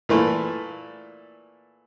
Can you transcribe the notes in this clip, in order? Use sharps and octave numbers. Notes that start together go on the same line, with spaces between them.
A#2 E3 A3